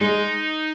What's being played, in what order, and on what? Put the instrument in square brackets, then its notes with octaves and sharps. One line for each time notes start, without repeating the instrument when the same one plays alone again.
[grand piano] G#3 [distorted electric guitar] D#4